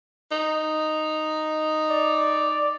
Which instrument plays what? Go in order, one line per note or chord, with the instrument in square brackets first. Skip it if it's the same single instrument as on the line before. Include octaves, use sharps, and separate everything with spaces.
[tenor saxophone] D#4
[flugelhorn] D5